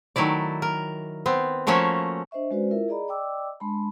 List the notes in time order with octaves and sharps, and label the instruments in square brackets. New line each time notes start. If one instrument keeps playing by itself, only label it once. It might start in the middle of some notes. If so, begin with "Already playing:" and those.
[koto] D#3 F#3 A3 E4 D5
A#4
B3 C4
F3 A3 A#3 C#4 F#4 E5
[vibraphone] D4 C5 D#5 E5 C#6
G#3 C#4 F#4 B4 C5 D5
E4 F4 A#4 E5
G#4 D5 D#5 A#5 B5
D5 D#5 G5 D6 E6
G#3 D4 A5 B5 C6